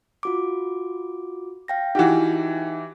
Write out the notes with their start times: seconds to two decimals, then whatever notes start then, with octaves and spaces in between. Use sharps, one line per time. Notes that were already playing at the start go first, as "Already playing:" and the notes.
0.23 F4 F#4 D6
1.68 F5 G5 A#6
1.95 E3 D#4 F#4 G4